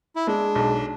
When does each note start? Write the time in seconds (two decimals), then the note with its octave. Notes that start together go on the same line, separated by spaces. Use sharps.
0.16 E4
0.27 G#3 D4
0.55 B1